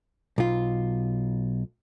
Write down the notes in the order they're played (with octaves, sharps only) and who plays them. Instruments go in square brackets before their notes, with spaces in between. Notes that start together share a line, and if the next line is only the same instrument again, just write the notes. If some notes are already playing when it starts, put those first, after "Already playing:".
[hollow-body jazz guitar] B1 F4